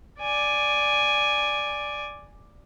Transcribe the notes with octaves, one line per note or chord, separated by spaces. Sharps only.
D5 G#5